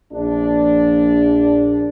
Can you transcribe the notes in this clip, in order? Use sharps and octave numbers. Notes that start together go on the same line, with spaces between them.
A#1 D4